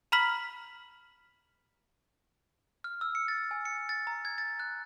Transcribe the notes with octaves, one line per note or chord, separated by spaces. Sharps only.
A#5 B5 F6 B6 F#7
F6
E6
C#7
A6
G#5
C#7
A6
A#5
G#6
A6
F#6